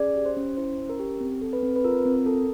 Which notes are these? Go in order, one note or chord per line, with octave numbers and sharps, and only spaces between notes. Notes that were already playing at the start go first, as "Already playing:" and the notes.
Already playing: C#4 G#4 D5
G4
C5
C#4
E4 C5
C#4
A#4
G4
C4
A4
B4
C4
B4
F4 A#4
C4
A4